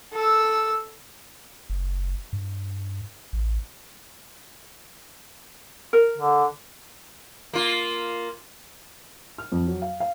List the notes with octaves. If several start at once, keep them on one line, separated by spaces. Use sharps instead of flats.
A4 E6
F#1
G2
A1
A#4
D3
A#3 F4
F6
F2
F#3
F5
F5